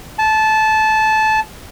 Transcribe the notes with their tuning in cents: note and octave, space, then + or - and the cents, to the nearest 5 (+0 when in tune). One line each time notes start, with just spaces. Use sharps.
A5 -15